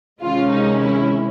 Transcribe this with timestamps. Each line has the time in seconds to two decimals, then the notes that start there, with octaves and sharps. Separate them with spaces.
0.21 C3 D#3 G#3 C#4 F4
0.51 D#4
0.80 E4